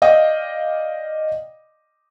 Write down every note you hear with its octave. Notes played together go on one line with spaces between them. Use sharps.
D5 D#5 F5 G5 D#6